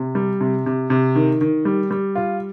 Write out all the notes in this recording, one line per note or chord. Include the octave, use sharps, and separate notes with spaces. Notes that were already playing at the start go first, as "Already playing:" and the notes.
Already playing: C3
G3
C3
C3
C3
D#3
D#3
G3
G3
F4